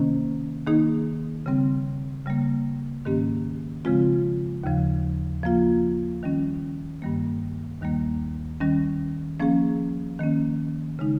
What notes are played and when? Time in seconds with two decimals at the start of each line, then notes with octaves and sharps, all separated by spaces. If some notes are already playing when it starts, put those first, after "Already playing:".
Already playing: C3 D#3 A#3 C#4
0.67 D#3 A#3 D#4 G#4
1.46 C#3 G3 C4
2.26 C#3 G3 A#3
3.05 G#2 D#3 A#3 C#4 G4
3.85 C#3 F3 G#3 C4 F4
4.64 D#2 C#3 F3
5.43 F3 A#3 F4
6.23 D#3 G3 C#4
7.02 G2 D#3 G3 A#3
7.81 D#2 D#3 G3 A#3
8.60 D#3 G3 C#4
9.40 F3 A#3 C#4 G#4
10.19 D#3 A#3 C#4
10.99 C#3 G#3 D#4